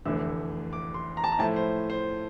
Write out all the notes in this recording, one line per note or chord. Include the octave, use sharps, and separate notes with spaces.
F1 E2 D3 A3 E4 E6
D6
C6
A#5
A5
A#5
A2 F3 A3 E4 A5
C5
C5